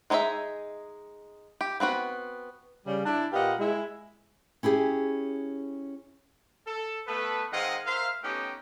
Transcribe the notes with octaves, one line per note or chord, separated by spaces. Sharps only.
G#3 D#4 G#4 C5 E5
G4
B3 C4 F#4 B4
C#3 G3
D4 E4
A#2 G4 B4 D#5 F5 F#5
G#3 E4
C#4 E4 G4 G#4
A4
A3 B3 A4 B4
D#3 G#3 C4 D#5 F5 F#5
A#4 C5 E5 F5
A3 B3 C#4 D#4 G4